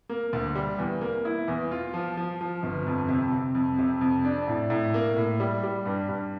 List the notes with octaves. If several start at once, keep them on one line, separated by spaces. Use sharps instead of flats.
A#3
D2
G3
E2
A#3
E4
E2
F4
F3
F3
F3
G1
F2
C3
C3
F2
C3
F2
D4
A2
A2
A#3
A2
G3
G3
G2
G2